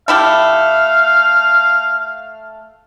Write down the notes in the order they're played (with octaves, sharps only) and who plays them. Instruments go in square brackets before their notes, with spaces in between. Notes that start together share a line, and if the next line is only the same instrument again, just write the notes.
[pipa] A3 E4 G4 [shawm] F5